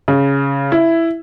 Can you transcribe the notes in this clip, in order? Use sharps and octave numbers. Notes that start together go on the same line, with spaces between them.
C#3
E4